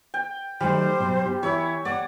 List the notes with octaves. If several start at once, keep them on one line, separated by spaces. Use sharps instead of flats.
G5
D#3 F#3 G3 A3 C5
B2 F#3
G4
E3 E4 A#4 C#5
A#3 D5 F#5